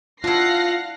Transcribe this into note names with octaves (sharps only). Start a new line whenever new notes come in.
D4 E4 F4 F5 F#5 F#6 A#6 C7